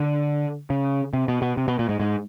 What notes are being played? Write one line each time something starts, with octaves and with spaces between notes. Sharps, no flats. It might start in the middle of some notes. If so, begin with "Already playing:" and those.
Already playing: D3
C#3
C3
B2
B2
C3
B2
A#2
G#2
G#2